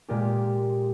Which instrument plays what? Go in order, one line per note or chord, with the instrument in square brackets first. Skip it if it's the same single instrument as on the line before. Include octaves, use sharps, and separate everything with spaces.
[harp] A#2 G#3 A#3 F4 G4